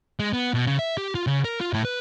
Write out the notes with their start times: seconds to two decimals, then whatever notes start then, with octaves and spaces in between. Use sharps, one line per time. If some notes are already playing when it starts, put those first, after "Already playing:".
0.20 G#3
0.33 B3
0.54 B2
0.67 C#3
0.79 E5
0.97 G4
1.15 F4
1.27 C#3
1.45 A#4
1.61 F4
1.73 A2
1.85 B4